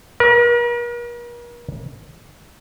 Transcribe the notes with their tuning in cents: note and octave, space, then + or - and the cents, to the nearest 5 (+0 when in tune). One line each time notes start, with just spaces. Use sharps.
A#4 +45